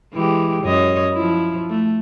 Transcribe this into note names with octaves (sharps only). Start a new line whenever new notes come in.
E3 G#3 G4
F#2 C#5 D#5
F3 E4
A3